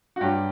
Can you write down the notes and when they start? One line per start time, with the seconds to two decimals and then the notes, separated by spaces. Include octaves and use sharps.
0.16 F#4
0.21 G2 F#3 G4